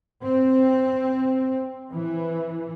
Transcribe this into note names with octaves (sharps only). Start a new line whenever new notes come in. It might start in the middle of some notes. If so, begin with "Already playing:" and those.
C4
E3